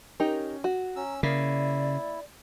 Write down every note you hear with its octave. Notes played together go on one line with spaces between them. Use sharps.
C#4 D#4 G4 A#4
F#4
C#4 A#5 E6
C#3 A#3 E4 D5